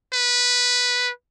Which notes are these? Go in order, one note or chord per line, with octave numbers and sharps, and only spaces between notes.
B4